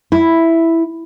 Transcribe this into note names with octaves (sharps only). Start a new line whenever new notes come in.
E4